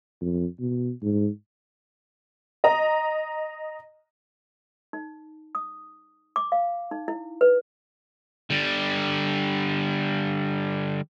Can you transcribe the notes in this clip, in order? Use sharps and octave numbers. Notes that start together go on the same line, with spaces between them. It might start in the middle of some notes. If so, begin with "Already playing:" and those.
F2
B2
G#2
D#5 A#5
D#4
D#6
D6
F5
D#4
E4
B4
D3 G3